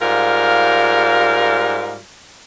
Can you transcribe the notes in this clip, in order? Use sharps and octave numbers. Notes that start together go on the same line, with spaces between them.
G#2 G3 F4 A#4 F5